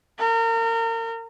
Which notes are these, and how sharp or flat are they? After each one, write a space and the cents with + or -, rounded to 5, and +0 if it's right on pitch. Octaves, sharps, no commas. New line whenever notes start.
A#4 -35